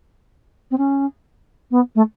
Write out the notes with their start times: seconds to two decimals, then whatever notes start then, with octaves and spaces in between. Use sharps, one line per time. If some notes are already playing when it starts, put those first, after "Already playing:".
0.71 C4
0.77 C#4
1.71 B3
1.95 A3